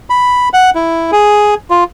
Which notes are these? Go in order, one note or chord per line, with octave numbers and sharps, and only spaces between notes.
B5
F#5
E4
G#4
F4